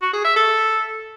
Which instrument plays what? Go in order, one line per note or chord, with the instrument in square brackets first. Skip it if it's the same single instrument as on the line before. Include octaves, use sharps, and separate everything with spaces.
[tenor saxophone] F#4
G#4
E5
A4